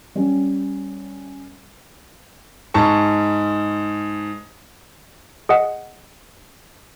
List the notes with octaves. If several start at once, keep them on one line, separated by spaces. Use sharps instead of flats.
G3 C#4
G#2 A5 C#6
G#4 D#5 F#5